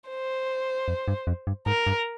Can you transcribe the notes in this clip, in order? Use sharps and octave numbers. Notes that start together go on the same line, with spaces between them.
C5
F2
G2
F2
G2
G#2 A#4
G2